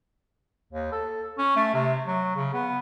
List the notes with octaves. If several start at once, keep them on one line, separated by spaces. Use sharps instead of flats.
D#2
A4
C#4
A3
C3
F#3
C#3
B3